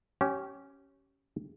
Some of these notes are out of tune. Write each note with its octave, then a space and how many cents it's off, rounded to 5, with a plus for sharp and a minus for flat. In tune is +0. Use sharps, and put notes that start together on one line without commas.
C#4 +0 G4 -25